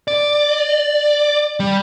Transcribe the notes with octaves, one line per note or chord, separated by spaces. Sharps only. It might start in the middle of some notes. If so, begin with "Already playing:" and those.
D5
G3